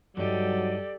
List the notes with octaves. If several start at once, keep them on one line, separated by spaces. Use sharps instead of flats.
G2 F#3 D#4 G4 A4 D5